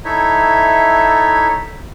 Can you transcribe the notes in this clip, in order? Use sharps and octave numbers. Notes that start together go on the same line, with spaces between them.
D#4 E4 A4 C#5 E5